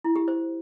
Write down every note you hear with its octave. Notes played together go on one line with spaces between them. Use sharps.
E4
G4
C5